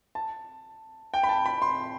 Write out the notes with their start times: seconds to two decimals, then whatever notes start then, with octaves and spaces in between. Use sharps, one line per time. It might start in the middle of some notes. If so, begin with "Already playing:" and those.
0.15 A5
1.14 G5
1.23 B5
1.29 A5
1.46 B5
1.62 C6